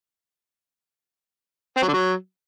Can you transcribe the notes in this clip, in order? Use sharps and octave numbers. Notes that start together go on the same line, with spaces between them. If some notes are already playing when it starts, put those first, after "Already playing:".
C4
F#3
D3
F#3